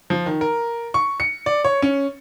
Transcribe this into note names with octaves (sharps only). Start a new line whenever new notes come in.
F3
D#3
A#4
C#6
C#7
D5
C#5
C#4